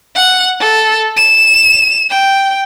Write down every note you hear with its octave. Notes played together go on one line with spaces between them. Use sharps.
F#5
A4
E7
G5